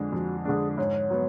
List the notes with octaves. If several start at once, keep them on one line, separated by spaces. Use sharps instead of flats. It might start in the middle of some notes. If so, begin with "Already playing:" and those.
Already playing: F2 D3 G#3 D4
F2 F#4
D3 G#3 D4 G#4
G#2 C#5
F#3 B3